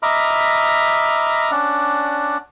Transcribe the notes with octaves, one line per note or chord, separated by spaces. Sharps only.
D#5 E5 A#5 B5 D6 F6
C#4 D4 D5 F#5